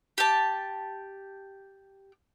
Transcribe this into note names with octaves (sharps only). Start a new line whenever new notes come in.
G4 A5